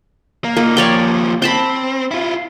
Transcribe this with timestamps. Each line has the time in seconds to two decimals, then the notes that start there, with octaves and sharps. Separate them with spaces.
0.44 A#3
0.57 A#3 D#4 F4
0.77 D#2 F3 C#5 D5 G5
1.42 C4 G5 A5 B5
2.11 E4 F4